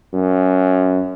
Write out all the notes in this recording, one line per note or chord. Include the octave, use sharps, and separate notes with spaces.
F#2